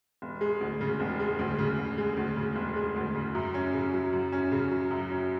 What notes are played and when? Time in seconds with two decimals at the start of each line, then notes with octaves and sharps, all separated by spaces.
0.22 E1
0.41 G#3
0.61 D2
0.81 C#3
1.00 E1
1.19 G#3
1.39 D2
1.58 C#3
1.78 E1
1.98 G#3
2.17 D2
2.36 C#3
2.56 E1
2.76 G#3
2.96 D2
3.15 C#3
3.35 F#2
3.54 C#4
3.74 C#3
3.93 F#3
4.13 F#2
4.32 C#4
4.52 C#3
4.71 F#3
4.91 F#2
5.10 C#4